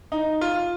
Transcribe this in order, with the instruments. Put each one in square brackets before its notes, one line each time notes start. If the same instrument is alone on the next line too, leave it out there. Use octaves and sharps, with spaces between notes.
[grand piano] D#4
F4